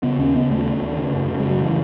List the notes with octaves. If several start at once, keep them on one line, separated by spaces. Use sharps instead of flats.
C#3 B3
D#2 C#4
C#3 B3
D#2 A3
C#3
D#2
C#3
F#2
C#3
G#3
F#2 F#3
C#3 E3